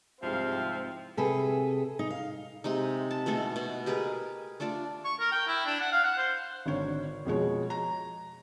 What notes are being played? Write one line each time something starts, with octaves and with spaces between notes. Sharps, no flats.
C2 G#2 F3 C4 G4 E5 F5
C3 G#4 A4 B4
D#4
F5
C3 G#3 D#4
A5
B2 G#3 A3 A4
B2
G4 G#4 A#4 B4
A3 D4 F4 D5
C#6
A#4
G5
E4
D4
F#5
F5
F#5
C5
G#1 D3 C#5
F2 B2 G#3 C#5
A#5